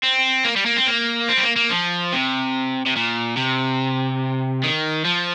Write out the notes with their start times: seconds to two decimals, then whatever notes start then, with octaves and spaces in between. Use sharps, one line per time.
0.03 C4
0.44 A#3
0.56 G3
0.66 A#3
0.77 C4
0.87 A#3
1.29 C4
1.38 G3
1.43 A#3
1.56 A#3
1.70 F3
2.13 C3
2.86 C3
2.96 A#2
3.37 C3
4.63 D#3
5.05 F3